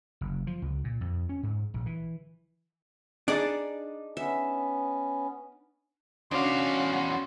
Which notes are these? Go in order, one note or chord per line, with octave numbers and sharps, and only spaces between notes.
F#1
F3
C#2
A#2
F2
C#4
G#2
A#1
E3
D4 D#4 G#4 D5
B3 C#4 E5
E2 C#4 D4 F#4 F5 C6